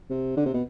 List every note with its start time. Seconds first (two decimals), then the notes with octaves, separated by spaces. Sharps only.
0.10 C3
0.37 D3
0.46 C3
0.54 B2